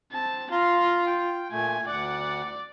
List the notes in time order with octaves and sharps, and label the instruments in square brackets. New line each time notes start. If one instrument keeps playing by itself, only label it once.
[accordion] C4 [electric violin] A5
[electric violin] F4 [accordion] F5 A#5 C6
[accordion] G5
[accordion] A#2 A3 [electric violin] G#5
[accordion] D2 F#5 [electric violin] D5